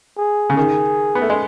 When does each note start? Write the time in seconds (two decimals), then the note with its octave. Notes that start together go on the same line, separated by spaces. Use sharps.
0.18 G#4
0.50 C#3
0.57 D#3 G#4
1.15 B3
1.22 A3
1.30 G#3